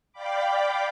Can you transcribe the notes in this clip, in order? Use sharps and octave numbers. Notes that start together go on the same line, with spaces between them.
D5 F5 G5 B5 D6